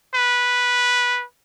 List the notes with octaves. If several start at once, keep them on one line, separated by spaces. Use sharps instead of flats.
B4